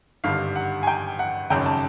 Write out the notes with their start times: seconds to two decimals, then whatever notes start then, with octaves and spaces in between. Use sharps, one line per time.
0.24 G#1 G2 D3 F5
0.56 F#5
0.83 G#5
0.87 G5
1.19 F#5
1.50 G#1 F#2 C#3 G5
1.66 A5